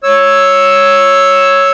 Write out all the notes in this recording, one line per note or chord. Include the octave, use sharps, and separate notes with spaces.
C#5 E6